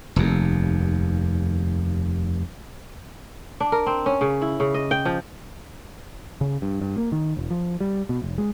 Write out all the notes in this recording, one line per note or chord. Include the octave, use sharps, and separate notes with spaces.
F1 D#2
D4
A#4
C4
C#4
C#3
E4
C#3
D#5
G5
F3
C#3
G2
G2
A#3
D#3
E1
F3
G3
B2
F1
G#3